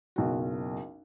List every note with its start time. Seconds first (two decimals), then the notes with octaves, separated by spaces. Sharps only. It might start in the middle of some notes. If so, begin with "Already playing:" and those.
0.16 F#1 B1 F#4